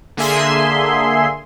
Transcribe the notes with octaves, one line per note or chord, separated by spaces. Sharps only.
D3 A#3 G#4 E5 G#5 C6